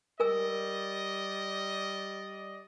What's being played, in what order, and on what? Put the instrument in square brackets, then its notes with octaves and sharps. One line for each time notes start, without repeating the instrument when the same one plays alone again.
[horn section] G3 D5 D#5 [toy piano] A#4 G#5 E6